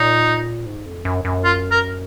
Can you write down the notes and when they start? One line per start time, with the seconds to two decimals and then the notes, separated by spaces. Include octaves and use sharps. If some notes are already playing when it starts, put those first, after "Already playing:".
Already playing: A#2 D#4
0.66 G#2
0.86 F2
1.05 F#2
1.25 F#2
1.44 F4
1.71 A#4